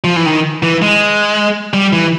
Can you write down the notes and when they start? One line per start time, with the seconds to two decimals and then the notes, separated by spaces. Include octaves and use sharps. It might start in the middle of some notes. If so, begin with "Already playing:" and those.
0.04 F3
0.16 E3
0.26 D#3
0.63 E3
0.82 G#3
1.74 G3
1.93 E3